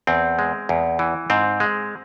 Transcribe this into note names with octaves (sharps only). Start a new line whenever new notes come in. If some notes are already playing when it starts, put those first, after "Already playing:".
E2 C4
G#3
E2
E3
G#2 C4
G#3